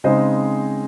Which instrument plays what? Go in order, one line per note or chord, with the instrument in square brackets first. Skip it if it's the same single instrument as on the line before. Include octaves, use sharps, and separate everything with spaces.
[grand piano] C#3 G#3 C4 D#4 C5 D#5